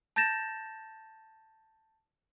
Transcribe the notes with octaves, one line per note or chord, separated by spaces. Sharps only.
A5 G6 A6 A#6 E7